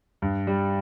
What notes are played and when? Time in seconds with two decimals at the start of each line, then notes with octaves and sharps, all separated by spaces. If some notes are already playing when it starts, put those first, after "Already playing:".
0.22 G2
0.47 G3